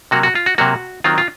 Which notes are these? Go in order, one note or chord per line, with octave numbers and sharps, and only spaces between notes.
C3 F#3 A#3 F#4
F#4
F4
F#4
C3 F#3 A#3 F#4
D#3 F#3 C4 F4
F4